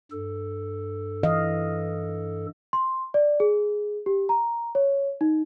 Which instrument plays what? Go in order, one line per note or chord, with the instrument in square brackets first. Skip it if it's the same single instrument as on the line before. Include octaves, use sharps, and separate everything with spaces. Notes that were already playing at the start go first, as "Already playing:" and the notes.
[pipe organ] G2 A4
[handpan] E3 D#5 F5
[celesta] C6
D5
G#4
G4
A#5
C#5
D#4